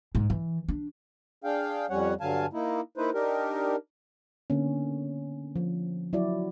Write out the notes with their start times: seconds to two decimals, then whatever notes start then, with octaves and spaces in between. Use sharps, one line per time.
0.15 G#2
0.30 E3
0.68 D4
1.44 D4 G#4 F5 G5
1.90 F2 G3 C#4 C#5 F#5
2.21 G2 D3 F#3 F5 G#5 A5
2.53 A#3 D#4 E4
2.97 A#3 D#4 E4 B4 C5
3.14 D4 D#4 G4 A#4
4.50 D3 A#3 B3 C#4
5.56 F3
6.13 F#3 E4 F#4 D5